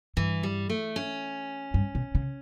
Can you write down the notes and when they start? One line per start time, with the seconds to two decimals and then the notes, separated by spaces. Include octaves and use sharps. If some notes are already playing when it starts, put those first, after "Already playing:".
0.17 G2 E3
0.43 G3
0.70 A3
0.96 C#4
1.74 G2
1.95 B2
2.15 C#3